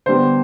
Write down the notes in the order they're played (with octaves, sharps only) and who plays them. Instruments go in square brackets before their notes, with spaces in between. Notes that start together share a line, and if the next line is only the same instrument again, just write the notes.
[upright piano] D3 G3 B3 C5